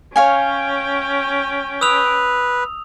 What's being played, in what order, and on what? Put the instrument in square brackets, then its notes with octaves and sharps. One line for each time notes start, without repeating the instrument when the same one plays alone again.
[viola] C#4 G5 [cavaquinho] C#5 F5 G#5
[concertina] B4 [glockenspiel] D#6 E6 F7